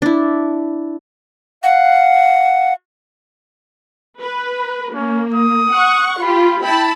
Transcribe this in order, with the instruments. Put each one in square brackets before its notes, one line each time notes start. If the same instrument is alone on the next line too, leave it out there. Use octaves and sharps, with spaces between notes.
[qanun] D4 E4
[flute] F5 [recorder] F#5
[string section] B4
[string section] A#3 [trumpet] C#4
[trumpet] D#6
[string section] F#5 C#6
[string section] F4 G4 [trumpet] B5
[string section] E4 A5 B5 [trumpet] G5